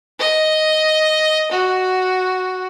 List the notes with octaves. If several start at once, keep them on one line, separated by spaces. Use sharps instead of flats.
D#5
F#4